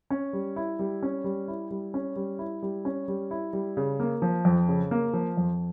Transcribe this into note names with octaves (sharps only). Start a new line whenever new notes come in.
C#4
G3
E4
G3
C#4
G3
E4
G3
C#4
G3
E4
G3
C#4
G3
E4
G3
C#3
A#3
F3
F2
C#3
A#3
F3
F2